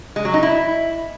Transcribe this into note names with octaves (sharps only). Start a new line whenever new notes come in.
G#3
F#3
D#4
E4